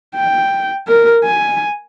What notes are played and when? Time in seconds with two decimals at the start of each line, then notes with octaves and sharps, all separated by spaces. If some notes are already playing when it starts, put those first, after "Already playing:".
0.15 G5
0.88 A#4
1.24 G#5